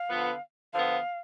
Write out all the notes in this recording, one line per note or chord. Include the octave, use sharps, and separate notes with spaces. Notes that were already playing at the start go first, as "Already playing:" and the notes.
Already playing: F5
D3 F3 B3
D3 F3 B3 F5